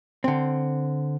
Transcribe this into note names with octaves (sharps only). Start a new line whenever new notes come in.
D3 C4